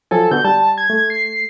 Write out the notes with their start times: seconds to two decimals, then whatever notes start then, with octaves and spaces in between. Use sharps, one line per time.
0.11 F3 F#3 A4 G#5
0.31 D3 B3 F#4 G6
0.45 G3 A5
0.78 G#6
0.90 A3
1.10 C7